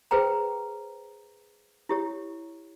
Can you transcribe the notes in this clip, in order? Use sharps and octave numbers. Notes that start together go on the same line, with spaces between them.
G#4 B4 C5 G5 A#5
E4 G4 C#5